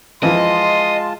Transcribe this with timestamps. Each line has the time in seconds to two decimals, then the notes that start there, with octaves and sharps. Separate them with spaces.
0.23 E3 F3 G#3 F4 D#5 A5 C6